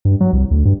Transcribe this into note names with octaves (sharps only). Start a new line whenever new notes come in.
G2
F#3
C2
D2
G2